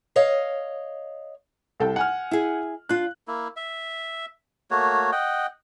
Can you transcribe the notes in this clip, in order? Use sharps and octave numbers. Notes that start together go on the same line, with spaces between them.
C#5 D#5 F5
C2 A4 G5
F#5 G#5 F6
E4 G#4
D4 F4 F#6
A#3 E4
E5
A3 A#3 F#4 C#5
D#5 F#5 G5